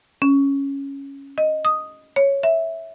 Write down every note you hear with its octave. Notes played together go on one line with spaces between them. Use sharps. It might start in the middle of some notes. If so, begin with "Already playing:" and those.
C#4
D#5
D#6
C#5
E5